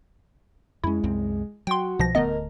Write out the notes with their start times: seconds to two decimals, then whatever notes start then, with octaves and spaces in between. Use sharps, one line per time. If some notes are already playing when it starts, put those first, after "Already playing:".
0.84 F2 G#3 C#4 E4
1.04 C2 F#2 C4
1.67 F#3 F#4 G5 C6
1.99 C2 B2 F3 A#6
2.15 D1 D3 A3 B3 A#4 D#5